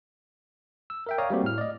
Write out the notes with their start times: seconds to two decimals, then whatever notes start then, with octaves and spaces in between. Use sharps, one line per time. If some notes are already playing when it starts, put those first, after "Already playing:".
0.90 E6
1.07 A#4 E5 G5
1.18 C#5 D5 F5 A#5 D#6
1.30 G3 A3 A#3 C4 F#4 G4
1.44 A2 F6
1.58 D5 D#5